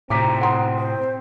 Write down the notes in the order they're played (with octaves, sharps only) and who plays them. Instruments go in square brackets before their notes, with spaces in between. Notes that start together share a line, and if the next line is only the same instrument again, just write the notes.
[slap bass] A2 C3 [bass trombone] C4 [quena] A#5 [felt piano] D6 B6
[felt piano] F#5 C6 D#6
[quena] C5